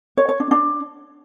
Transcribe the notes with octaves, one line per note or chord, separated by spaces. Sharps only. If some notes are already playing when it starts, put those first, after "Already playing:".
C#5
C#5
D4
D4